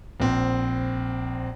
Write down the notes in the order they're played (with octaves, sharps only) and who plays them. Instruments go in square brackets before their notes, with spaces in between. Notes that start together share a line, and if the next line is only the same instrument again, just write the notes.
[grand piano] A#1 C4